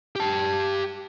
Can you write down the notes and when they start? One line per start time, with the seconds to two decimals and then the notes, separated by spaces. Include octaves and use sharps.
0.16 G4 A5